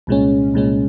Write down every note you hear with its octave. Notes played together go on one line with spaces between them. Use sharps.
C2 A#2 G#3 C#4
C2 A#2 G#3 C#4